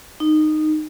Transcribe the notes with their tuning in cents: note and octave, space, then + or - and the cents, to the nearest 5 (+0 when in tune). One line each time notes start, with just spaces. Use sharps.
D#4 -15